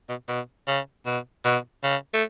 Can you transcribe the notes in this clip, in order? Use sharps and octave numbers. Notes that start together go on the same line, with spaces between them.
B2
B2
C#3
B2
B2
C#3
A3